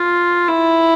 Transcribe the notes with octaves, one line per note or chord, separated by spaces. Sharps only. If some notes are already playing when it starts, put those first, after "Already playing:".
Already playing: F4
E4